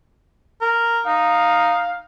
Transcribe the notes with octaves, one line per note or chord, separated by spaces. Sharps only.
A#4
D#4 F5